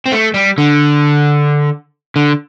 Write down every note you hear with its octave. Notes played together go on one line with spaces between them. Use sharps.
C4
A3
G3
D3
D3